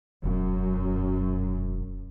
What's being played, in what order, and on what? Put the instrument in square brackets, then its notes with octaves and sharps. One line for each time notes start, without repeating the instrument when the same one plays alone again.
[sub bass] E1 [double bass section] F#2